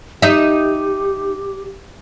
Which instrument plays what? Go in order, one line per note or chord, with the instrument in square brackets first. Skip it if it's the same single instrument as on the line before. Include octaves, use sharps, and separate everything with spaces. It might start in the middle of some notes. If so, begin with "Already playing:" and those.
[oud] D#4 E5 [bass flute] G4